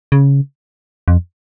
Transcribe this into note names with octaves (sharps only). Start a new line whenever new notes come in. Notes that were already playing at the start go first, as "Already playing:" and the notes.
C#3
F2